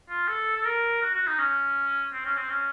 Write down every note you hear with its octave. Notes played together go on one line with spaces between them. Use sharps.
F4
A4
A4
A#4
F#4
F#4
D#4
C#4
C4
C#4
C4
C#4